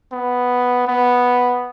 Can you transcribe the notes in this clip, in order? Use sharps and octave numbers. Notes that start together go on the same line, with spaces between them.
B3
B3